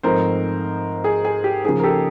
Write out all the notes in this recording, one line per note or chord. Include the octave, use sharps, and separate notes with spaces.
G#2 F3 A3 C4 D#4 A#4 C5
G#4
G#4
G4
C#3 F3 A#3 D#4 G#4
A#4
G4 A4